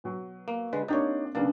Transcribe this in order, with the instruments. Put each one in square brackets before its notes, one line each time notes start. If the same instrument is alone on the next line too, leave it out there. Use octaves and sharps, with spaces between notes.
[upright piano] B2 F#3
[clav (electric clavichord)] A#3
D3 G#3 B4
[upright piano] A#3 C4 D4 [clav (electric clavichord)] D#4 G4 C#5
[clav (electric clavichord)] B1 A#3 [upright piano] C#3 B3 D4